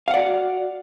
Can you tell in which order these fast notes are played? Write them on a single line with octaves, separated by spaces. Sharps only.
F5 F#5 D5 F#4